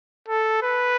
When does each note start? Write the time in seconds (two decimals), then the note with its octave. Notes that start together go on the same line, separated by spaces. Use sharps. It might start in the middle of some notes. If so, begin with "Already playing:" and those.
0.28 A4
0.63 B4